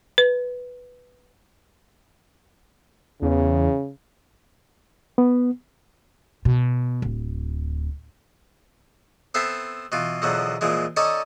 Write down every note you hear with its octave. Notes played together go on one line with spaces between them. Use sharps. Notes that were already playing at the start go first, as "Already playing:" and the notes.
B4
E2 C#3
B3
B2
D1
B3 C4 A4 C5 E5
B2 E3 F4
E2 B2 D3 F3 F#3
A#2 E3 F3 G#3
C#4 D#4 A4 D5 D#5